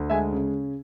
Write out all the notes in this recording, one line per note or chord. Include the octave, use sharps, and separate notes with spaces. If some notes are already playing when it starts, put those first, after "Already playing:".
Already playing: D2
G#3 E5 G#5
C#3